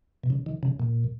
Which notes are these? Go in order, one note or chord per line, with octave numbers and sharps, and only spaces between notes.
B2
C#3
D#3
C#3
A#2